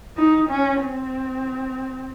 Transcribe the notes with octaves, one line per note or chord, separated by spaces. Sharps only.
D#4
C#4
C4